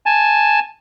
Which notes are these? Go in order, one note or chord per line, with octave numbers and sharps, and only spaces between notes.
G#5 A5